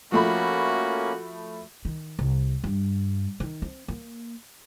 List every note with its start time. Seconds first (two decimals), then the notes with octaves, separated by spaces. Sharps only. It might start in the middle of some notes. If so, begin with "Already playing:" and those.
0.12 F3 A3 A#3 C#4 F#4 B5
1.85 D#3
2.19 C2
2.64 G2
3.40 D#3
3.62 C4
3.88 A#3